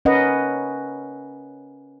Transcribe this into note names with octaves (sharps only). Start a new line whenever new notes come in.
C#4 A#4 B4 D#5 F#5